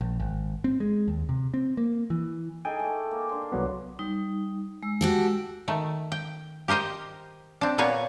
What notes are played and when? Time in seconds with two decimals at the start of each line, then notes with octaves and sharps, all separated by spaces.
0.01 A#1
0.20 G#1
0.64 C4
0.80 G#3
1.08 D#2
1.29 C3
1.54 C4
1.77 A#3
2.10 E3
2.65 D#4 G#4 A4 G5 G#5
2.79 A3 A5 D6
3.11 A#3
3.29 D4 C6
3.52 C2 F#3 B3
3.99 G3 D#4
4.83 G#3 E6
5.01 F#4 G4 A4
5.68 D#3 A3
6.12 G5
6.68 G4 A#4 C5 D#5 G5
7.61 C4 D4
7.78 A#2 A#3 B3 B4 C#5